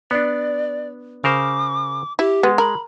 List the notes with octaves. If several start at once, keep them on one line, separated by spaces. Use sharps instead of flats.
B3 D4 D5
C#3 A#4 C5 D6
E4 G4
G#3 B3
A#4 B5